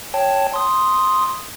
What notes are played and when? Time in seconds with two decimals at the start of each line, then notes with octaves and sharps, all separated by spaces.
0.14 C#5 G5 A5
0.54 C6 D#6